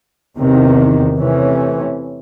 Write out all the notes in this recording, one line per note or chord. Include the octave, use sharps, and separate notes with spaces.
E2 C3 D#3
C3 E3 A3 C#4